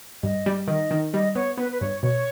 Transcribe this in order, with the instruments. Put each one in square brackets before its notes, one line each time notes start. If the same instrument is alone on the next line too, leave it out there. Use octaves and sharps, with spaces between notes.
[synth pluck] G2 [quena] D#5
[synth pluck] G3
[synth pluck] D#3 [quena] D#5
[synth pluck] D#3
[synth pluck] G3 [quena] D#5
[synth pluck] B3 [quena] C#5
[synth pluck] B3 [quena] B4
[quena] B4
[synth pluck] G2 [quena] C#5
[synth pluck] B2 [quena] C#5